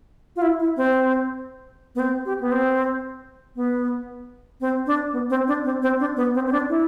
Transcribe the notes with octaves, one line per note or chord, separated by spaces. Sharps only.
F4
E4
E4
C4
B3
C4
G4
B3
C4
B3
C4
D4
B3
C4
D4
C4
C4
D4
B3
C4
C4
D4
E4